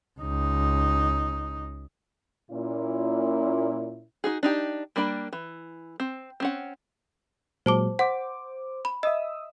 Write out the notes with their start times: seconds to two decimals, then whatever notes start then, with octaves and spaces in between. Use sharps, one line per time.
0.20 C#2 D#4
2.51 A#2 C#4 E4
4.24 D#4 F#4 G#4
4.43 D4 D#4 G4
4.96 G3 A#3 D4 B5
5.33 E3
6.00 C4
6.40 C4 C#4 F#5
7.66 A#2 F#3 G#3 C5 A5 D6
7.99 C5 F#5 D6
8.85 B5
9.03 D#5 E5 D#6 E6